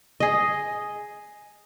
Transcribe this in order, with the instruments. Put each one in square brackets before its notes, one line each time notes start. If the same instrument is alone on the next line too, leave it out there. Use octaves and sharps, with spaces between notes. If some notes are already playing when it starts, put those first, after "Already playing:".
[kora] G#4 D#5